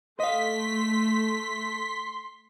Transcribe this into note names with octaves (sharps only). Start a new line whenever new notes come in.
A3 D#5 F5 C6 B6